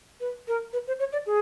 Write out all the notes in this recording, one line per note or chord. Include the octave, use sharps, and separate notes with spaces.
B4
A#4
B4
C5
C#5
D5
G#4